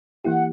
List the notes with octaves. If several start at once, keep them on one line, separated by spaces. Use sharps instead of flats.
E3 A#3 E4 G4 F#5